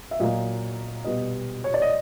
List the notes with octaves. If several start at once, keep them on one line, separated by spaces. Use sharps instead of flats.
E5
A#2 F#3 A#3 D#5
B2 G3 B3 D#5
C#5
D5
D#5